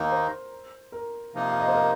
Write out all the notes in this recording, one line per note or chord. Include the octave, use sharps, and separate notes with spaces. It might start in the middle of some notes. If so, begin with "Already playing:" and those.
Already playing: D#2 D#3 A#3 D#4 A#4
C5
A#4
C3 F3 A#3 D#4
F5
D#5
C5
A#4